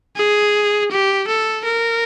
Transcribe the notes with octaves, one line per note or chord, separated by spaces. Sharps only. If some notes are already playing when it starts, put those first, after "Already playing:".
G#4
G4
A4
A#4